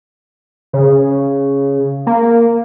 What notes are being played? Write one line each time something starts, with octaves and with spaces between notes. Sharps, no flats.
C#3
A#3